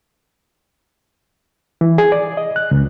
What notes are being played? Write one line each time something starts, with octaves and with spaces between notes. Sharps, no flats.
E3
G#4
D5
D#5
F#6
C#2